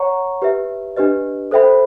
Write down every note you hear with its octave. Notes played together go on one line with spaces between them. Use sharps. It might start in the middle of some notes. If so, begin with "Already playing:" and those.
Already playing: C#5 F#5 A#5 C#6
G4 B4 E5
D4 G4 B4 D#5
A4 C5 E5 G5 B5